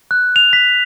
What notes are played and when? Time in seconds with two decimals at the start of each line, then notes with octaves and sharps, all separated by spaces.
0.11 F#6
0.36 F7
0.53 B6